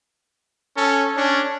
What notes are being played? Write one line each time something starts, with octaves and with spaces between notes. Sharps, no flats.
C#4 A4
C#4 D4